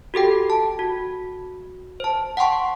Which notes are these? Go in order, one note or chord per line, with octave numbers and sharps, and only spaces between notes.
F#4 G4 A4 G5
A5
F#4
C5 A5
F#5 G5 A5 C6 C#6